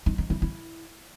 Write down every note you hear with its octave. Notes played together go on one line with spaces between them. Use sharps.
D#4
D#4
E4
E4